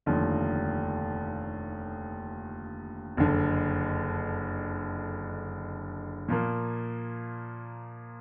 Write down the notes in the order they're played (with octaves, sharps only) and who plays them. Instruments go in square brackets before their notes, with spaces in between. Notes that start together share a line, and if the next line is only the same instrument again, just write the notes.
[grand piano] F1 D#2 D3 F3
F#1 F2 D3
A#2 F3 A#3